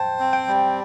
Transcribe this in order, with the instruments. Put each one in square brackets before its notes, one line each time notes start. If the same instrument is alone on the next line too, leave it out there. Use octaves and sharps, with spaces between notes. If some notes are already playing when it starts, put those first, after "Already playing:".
Already playing: [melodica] C5 [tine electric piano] G5 A5
[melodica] C4
[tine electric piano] G5
[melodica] G3